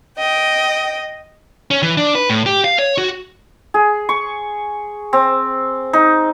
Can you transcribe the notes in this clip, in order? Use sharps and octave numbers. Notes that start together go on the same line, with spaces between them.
D#5 G5
C#4
E3
D4
B4
A2
G4
F5
C#5
F#4
G#4
C#6
C4
D#4